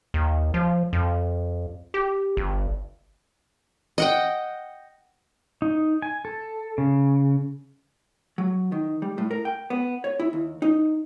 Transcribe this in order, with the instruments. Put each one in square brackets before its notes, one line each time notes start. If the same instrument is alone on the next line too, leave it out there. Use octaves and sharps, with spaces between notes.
[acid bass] D#2
F3
F2
G4
G1
[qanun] D#5 F#5 G5
[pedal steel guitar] D#4
G#5
A4
C#3
[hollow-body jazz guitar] F#3
D#3
G3
A2
A#4
G5
B3
C#5
E4
D#2
D#4